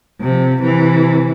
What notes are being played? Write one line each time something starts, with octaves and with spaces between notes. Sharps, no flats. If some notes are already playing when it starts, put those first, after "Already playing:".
C3 F3
C3 E3